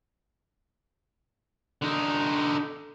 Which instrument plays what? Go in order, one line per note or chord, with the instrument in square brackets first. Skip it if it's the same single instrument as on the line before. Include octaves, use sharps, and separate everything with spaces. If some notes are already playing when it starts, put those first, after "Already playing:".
[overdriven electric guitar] D3 D#4